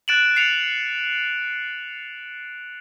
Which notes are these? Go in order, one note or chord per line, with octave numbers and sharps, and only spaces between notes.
F#6 A6 D7 E7 F#7
C7 C#7 F7